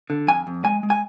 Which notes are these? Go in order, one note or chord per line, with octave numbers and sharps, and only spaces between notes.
D3
F2 G#5
F2
G#3 G#5
G#3
G#5